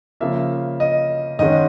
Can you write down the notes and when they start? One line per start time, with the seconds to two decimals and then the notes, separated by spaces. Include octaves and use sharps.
0.20 C#3 F3 A#3 E5
0.80 D#5
1.39 G#2 D#3 G#3 C#4 D#5